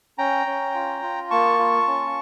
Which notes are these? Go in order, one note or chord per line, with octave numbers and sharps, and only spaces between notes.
C#4 G5 A#5
C#4
F4
F4
A#3 A5 C#6
F4
C#4